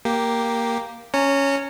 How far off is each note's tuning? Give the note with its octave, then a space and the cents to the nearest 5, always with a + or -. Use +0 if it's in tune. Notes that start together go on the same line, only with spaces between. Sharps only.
A#3 +0 G4 +0
C#4 +0 C#5 +0 A#5 -30